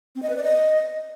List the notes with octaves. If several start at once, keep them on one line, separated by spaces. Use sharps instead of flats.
C4
D#5
B4
D5
D#5